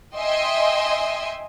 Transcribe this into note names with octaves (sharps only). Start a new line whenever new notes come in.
D#5 E5 G5 G#5 C6